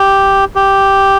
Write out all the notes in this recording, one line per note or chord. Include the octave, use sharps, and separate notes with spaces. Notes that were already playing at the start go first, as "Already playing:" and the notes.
Already playing: G4
G4